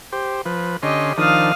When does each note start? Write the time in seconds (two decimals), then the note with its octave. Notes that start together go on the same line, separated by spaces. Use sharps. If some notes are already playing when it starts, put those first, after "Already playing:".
0.12 G4 C5
0.45 F3 B4
0.83 D3 C#4 G4 D#5 C6
1.18 D#3 F3 D4 F5 D#6